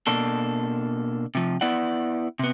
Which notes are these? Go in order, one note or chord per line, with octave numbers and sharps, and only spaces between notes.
B2 A#3 D4 A4
C3 F3
B3 E4 D5 F#5
C3 B3